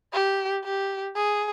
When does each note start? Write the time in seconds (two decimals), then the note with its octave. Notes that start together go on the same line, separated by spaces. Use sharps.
0.13 G4
0.64 G4
1.16 G#4